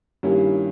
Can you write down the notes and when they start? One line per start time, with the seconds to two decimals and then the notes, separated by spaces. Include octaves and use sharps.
0.23 G2 D#3 G3 A#3 C#4 E4